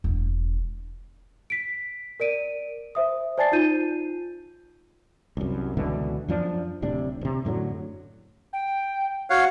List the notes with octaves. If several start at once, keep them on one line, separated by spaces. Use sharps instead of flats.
E1
B6 D7
A#4 D5 D7 D#7
C5 E5 D#6
C5 D5 G#5 A5 A6 C7
D#4 F4 G6 D#7
C2 F#2
C#2 B2 D3 E3
F#2 F3 D4
D1 A2 C3 D4
A1 C3
F#2 A2 D3 F#3
G5
F#4 C#5 F5 F#5